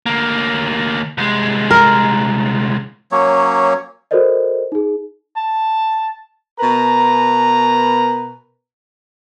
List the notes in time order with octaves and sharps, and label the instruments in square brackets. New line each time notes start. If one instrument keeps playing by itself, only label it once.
[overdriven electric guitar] D2 A#3
C2 G#3
[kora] A#4
[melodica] F#3 A#3 C#4 C#5
[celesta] F#4 A4 A#4 C5 D5 D#5
D#4 G#4
[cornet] A5
[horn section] B2 A#4 B4 A#5